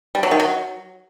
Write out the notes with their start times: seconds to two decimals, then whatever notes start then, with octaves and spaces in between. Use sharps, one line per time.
0.15 G3
0.23 F#3
0.31 D#3
0.40 F#3